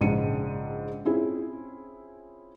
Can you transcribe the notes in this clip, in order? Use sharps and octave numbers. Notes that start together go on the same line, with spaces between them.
A#1 G#2 C#3 G#3 C#7 D#7
C4 C#4 E4 F4 G#4